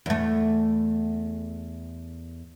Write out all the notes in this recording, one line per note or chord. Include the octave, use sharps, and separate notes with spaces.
E2 A3